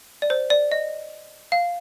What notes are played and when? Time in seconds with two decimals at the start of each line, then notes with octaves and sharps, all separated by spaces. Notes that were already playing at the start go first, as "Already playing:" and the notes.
0.22 D5
0.30 C5
0.50 D5
0.72 D#5
1.52 F5